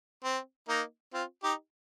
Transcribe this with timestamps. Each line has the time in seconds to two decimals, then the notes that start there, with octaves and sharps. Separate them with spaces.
0.24 C4
0.69 A#3 D#4
1.14 C4 F4
1.43 D#4 G4